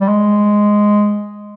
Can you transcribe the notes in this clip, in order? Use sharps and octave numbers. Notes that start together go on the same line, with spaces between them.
G3
G#3